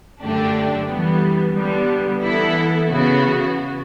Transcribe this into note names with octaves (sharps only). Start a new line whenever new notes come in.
F#2 D3 A3 D4 G4
E3 G3 B3
D3 G3 B3
E3 B3 E4 A4
C#3 E3 B3 F#4